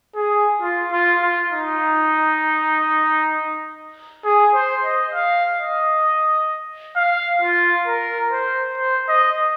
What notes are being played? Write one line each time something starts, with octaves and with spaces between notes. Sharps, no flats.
G#4
F4
F4
F4
D#4
G#4
C5
D#5
F5
D#5
F5
F4
A#4
C5
C5
D#5